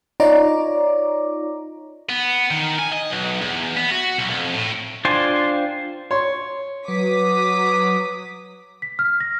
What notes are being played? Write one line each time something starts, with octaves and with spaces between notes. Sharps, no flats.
D#4 F4 C#5 D5 A#5 D6
B3
D#3
G#5
D#5
B1
E2
B3
F#4
B1
F2
A2
D4 F4 C5 G5 G#5
C#5 C6
F#3 B4 D6 D#6 B6
B6
F6
A#6